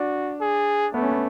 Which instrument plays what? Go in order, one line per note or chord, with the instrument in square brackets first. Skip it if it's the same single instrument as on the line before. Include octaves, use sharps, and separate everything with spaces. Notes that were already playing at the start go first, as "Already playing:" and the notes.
Already playing: [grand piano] D4 [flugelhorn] F#4
[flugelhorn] G#4
[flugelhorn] A3 [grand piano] B3
[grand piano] C#4
B3